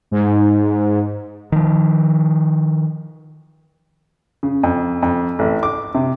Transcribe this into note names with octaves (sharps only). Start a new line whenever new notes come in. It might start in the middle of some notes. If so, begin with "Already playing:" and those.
G#2
D#3 F3
C#3
F2
F2
A1
D6
C3